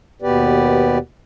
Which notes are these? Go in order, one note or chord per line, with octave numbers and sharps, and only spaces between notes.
D#2 B2 B3 G4 B4 D5